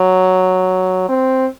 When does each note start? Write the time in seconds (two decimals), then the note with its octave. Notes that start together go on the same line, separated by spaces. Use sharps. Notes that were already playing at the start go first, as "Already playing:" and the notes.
Already playing: F#3
1.09 C4